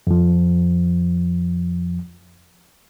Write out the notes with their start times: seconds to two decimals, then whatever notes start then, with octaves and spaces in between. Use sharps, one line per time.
0.07 F2 F3